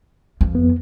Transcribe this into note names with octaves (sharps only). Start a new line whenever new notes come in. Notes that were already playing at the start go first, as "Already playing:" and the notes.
F2
B3